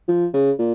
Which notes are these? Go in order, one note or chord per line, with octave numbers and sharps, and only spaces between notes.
F3
C#3
A#2